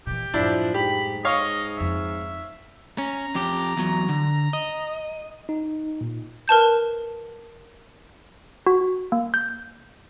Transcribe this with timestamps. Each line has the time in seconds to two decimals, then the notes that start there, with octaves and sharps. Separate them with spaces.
0.07 A#2 E3 G4
0.34 F#2 A2 F3 D4 E4
0.74 G#2 G4 B5
1.25 C#5 D#5 F5 C#6
1.77 F2 F4 E5
2.98 C#4 A#5
3.35 F2 G4
3.77 E2 F#3
4.09 D3
4.53 D#5
5.49 D#4
6.01 A#2
6.48 A#4 B4 A5 G6
8.67 F#4
9.12 A#3
9.34 G6